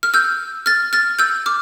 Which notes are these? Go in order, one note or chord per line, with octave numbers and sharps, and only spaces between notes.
F6
E6 G6
F6 A6
F6 A6
E6 G6
D6 F6